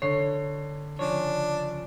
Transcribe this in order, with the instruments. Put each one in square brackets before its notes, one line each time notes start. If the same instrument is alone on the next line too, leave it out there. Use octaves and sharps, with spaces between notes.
[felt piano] D3 C7 [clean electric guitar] C#5
[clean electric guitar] C#3 F3 C#5 [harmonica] D4